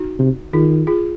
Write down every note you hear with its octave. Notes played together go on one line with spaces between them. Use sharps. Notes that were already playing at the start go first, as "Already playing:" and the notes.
Already playing: D#4 F#4
C3
D#3 F4 G#4
F4 G#4